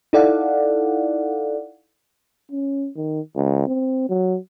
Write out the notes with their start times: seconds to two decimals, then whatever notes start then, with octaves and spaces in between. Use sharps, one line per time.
0.13 D#4 E4 A4 D5 F5 F#5
2.52 C#4
2.96 D#3
3.36 C#2
3.67 C4
4.09 F#3